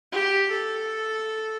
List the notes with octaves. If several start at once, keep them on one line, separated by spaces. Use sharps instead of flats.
G4
A4